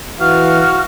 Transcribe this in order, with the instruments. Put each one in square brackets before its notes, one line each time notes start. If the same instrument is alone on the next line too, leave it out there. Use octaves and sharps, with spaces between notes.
[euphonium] E3 [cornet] F#4 [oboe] F5 [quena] F6